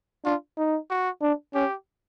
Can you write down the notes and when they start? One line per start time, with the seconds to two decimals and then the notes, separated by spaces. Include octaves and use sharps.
0.25 D4 F4
0.58 D#4
0.90 F#4
1.22 D4
1.54 C#4 G4